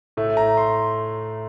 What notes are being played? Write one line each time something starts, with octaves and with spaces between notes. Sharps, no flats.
A2 A3
A#5
C6